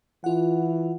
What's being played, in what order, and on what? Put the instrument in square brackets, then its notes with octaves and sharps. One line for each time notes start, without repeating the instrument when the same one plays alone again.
[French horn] E3 [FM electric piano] F4 F#5